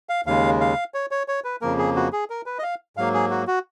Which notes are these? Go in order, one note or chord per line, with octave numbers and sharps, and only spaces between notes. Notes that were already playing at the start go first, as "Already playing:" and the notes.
F5
D#2 C#3 G#3 F5
F5
C#5
C#5
C#5
B4
F2 C#3 F3 A#3 A#4
G#4
F#4
G#4
A#4
B4
D#5
F5
G#2 F#3 A#3 F5
G#4
F#4
F#4